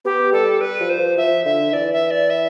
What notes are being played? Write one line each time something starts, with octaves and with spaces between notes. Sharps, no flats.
B3 G4
G3 A4
G3 B4
F3
C5
F3
F3 E5
D3 E5
E3 D5
E5
D5
E5